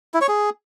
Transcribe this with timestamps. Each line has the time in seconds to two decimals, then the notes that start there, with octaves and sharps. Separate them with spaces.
0.14 E4
0.21 C#5
0.28 G#4